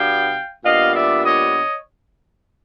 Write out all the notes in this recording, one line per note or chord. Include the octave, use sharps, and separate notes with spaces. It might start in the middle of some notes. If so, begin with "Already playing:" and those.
Already playing: B2 G3 B3 D4 F5 G5
A#2 G3 B3 D4 D#5 F5
D5 E5
C#5 D#5